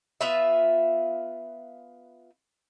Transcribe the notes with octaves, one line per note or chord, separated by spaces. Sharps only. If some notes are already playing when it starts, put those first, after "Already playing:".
B3 F4 B4 E5